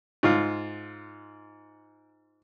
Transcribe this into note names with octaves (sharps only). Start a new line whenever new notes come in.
G#2 F4